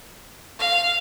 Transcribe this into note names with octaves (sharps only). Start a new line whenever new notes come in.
F5